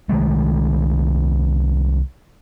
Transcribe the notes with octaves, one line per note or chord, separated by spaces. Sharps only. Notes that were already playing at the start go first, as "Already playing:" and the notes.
C2 D#3 G#3 A3